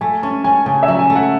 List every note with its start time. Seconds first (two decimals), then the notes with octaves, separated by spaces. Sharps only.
0.01 A3 G#5
0.23 C#4 A5
0.44 C#4 G#5
0.66 C#3 G#5
0.83 E5
0.88 F#3
0.99 G#5
1.10 A3
1.15 F#5